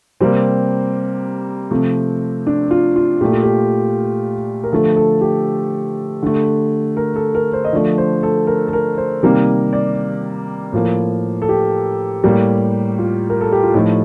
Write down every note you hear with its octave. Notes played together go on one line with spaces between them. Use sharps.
C3 G3 A#3 C4
C3 F3 A3
D4
F4
F4
A#2 A3 G4
F4
G4
A#4
D3 F3 A3 A4
A4
G4
D3 A3
A#4
A4
A#4
C5
D#5
D3 F3 A3 D5
C5
A4
A#4
A4
A#4
C5
C3 D#3 G3 A#3 A#4
D5
A2 F3 A#3
A4
G4
A2 G3 A#3
F4
A#4
A4
G4
F4
A2 F3 A3 D#4